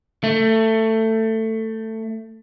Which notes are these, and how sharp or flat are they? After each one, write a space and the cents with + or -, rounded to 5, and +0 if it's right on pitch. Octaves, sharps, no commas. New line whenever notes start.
A3 +15